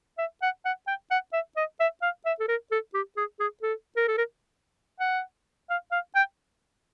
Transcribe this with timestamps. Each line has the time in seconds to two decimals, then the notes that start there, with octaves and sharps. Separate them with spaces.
0.18 E5
0.42 F#5
0.65 F#5
0.87 G5
1.11 F#5
1.33 E5
1.57 D#5
1.80 E5
2.02 F5
2.25 E5
2.40 A4
2.48 A#4
2.71 A4
2.94 G4
3.17 G#4
3.40 G#4
3.63 A4
3.96 A#4
4.08 A4
4.18 A#4
5.00 F#5
5.70 F5
5.92 F5
6.15 G5